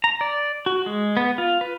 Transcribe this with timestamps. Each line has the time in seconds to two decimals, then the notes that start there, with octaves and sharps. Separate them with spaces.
0.04 A#5
0.21 D5
0.66 F#4
0.86 G#3
1.17 B3
1.38 F4
1.61 B4